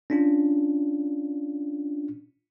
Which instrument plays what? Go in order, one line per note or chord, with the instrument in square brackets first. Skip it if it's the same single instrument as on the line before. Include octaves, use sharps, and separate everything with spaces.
[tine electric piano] C#4 D4 F4